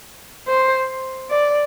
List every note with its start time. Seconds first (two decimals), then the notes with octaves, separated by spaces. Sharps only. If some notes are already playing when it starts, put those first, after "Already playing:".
0.47 C5
1.30 D5